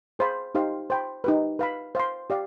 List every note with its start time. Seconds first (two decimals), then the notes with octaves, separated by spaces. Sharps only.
0.19 G#4 C5 F5 B5
0.55 D#4 G4 C5 F5
0.90 C5 G5 B5
1.24 D#4 G4 B4
1.59 B4 F5 B5
1.95 C5 F5 C6
2.30 G4 D5 F5